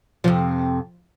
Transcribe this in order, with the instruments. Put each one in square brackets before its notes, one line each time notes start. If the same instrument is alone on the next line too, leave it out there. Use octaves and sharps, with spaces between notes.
[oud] F2 C3 [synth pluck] F3